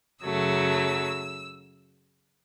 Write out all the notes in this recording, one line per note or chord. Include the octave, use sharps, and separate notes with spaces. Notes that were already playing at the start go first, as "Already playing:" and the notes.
F#2 C#3 F#3 A3 E6